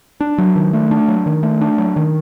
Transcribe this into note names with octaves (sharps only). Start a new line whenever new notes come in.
D4
F#3
D#3
A3
D4
F#3
D#3
A3
D4
F#3
D#3